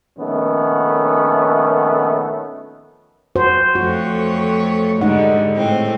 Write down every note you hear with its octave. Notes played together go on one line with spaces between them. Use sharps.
A#1 D#3 A3 B3 C#4
F#4 C5
F2 A3 F#4 C#5
G#2 D3 G3 G#3 D#4 F#5
A2 C4